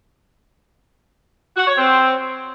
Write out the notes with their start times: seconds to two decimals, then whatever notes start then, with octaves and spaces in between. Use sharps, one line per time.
1.57 F#4
1.67 C#5
1.78 C4